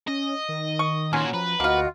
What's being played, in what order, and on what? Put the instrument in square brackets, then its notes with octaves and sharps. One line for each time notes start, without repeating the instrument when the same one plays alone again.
[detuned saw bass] C#4 [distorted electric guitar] D#5
[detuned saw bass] D#3
[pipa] C#6
[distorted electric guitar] A#2 F#4 [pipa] F#3 C#4 [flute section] C6 G#6
[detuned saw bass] F3 [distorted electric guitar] B4 [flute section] A#5
[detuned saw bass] D2 [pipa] A#3 F4 [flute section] F#4 D#5 F#5